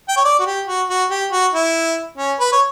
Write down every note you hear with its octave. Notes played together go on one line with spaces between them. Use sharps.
G5
C#5
D5
F#4
G4
F#4
F#4
G4
F#4
E4
C#4
B4
C#5